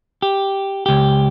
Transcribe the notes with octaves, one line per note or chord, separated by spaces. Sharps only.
G4
C#2 G4